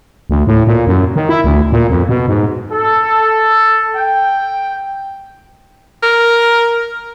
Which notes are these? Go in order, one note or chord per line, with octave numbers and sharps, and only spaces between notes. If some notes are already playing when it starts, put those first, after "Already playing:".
D2
A2
A#2
F#2
D#3
E4
D2
A#2
F2
B2
G#2
A4
G5
A#4